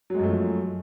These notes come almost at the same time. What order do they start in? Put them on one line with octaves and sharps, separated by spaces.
F#3 G#3 F#2 A3 F3